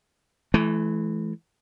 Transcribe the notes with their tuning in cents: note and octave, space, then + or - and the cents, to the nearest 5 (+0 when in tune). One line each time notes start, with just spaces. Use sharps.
E3 +10 A3 -35